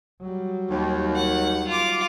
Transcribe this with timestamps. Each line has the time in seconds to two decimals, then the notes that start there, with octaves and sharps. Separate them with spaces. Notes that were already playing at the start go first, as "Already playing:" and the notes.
0.22 F#3 G3
0.70 D#2
1.16 F#5
1.67 F4 D6